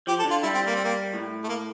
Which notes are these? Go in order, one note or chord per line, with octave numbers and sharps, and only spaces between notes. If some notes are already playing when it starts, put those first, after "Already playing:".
F3 G4
A4
D3
F4
G3 E4
C4
A#3
C4
A#3
A2
A3
A#3